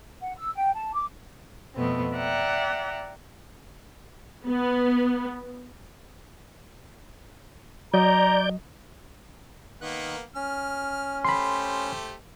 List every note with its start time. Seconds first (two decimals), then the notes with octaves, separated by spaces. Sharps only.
0.21 F#5
0.37 E6
0.56 G5
0.75 A5
0.94 D6
1.75 F2 B2 A3 B3 C4
2.14 D5 E5 F#5 G5 A#5
4.46 B3
7.94 F#3 D5 D#5 A#5 G6
9.81 D#3 A#3 B3 F#6
10.35 C#4 F6
11.25 A3 G4 C5 B5 C6